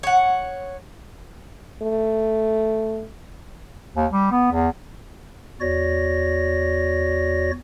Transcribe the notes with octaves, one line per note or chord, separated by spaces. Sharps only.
C#5 F#5
A3
D#2
G3
B3
E2
E2 F#4 C#5 D5 A#6